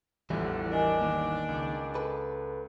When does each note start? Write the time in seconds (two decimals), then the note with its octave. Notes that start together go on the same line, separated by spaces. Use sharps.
0.30 A1 E2 D3 E3 F3 G3 E4
0.71 D4 A#4 D#5 G#5
1.01 D#3 A#3
1.49 C#2
1.95 A4 B4